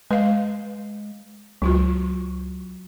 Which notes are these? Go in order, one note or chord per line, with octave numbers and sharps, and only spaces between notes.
G#3 B4 F5
C#2 F#3 F4 F#4